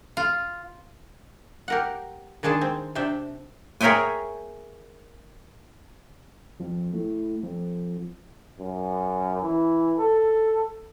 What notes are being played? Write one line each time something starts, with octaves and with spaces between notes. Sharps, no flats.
F4
G4 A#4 F#5
D#3 G#3 D4 G#4 A5
C4
C3 D4 E5 G5
G#4 A#4 C#5 E5 G5 G#5
F2
A2
F2
F#2
E3
A4